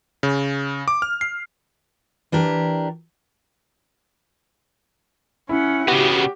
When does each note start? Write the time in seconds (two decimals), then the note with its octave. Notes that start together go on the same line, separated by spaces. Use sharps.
0.23 C#3
0.88 D6
1.02 F6
1.21 C7
2.32 E3 D4 G4 A#4
5.49 C#4 E4 F#5
5.88 C#3 B3 F#4 G4